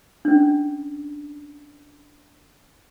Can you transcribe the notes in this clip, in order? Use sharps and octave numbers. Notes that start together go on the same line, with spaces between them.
C#4 D4